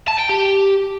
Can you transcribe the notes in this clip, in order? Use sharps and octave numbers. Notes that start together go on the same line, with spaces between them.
A5
G5
G4